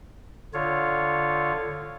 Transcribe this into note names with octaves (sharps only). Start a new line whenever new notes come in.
D3 F4 C#5